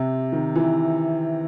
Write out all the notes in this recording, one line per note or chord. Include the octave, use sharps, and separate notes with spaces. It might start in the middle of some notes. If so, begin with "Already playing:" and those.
Already playing: C3
D#3
E3